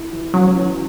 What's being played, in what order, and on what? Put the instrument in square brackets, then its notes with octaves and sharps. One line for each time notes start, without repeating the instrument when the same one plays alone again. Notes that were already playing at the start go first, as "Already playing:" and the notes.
Already playing: [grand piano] E4
E3
[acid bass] F#3 [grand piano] C#4
[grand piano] E3